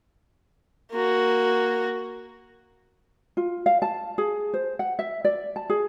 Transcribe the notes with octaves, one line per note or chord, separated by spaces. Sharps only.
A#3 F#4
F4
F5
A5
G#4
C5
F#5
E5
D5
A5
G#4